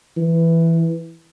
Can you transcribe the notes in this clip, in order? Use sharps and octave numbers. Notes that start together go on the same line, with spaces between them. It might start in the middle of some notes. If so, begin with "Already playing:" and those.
E3